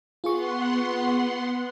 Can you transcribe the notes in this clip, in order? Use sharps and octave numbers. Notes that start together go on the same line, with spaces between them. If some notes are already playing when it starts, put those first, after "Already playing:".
B3 F4 G#4 F#5 C6 C#6